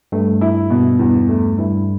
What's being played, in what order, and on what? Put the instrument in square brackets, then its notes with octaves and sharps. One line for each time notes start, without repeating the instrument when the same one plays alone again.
[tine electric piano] G2 [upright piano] A3
[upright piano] E4
B2
[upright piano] E2 [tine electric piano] G2
[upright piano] A3
[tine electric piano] G2 [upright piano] E4